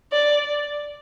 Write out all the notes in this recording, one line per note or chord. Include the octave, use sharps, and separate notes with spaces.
D5